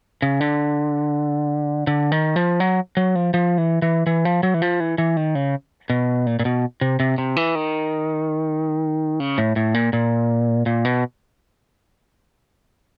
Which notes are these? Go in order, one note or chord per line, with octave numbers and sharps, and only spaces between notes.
C#3
D3
D3
D#3
F3
F#3
F#3
F3
F3
E3
E3
E3
F3
F#3
E3
F3
E3
E3
D#3
C#3
B2
A#2
A#2
B2
C3
C3
C3
E3
D#3
C#3
A2
A2
A#2
A#2
A#2
B2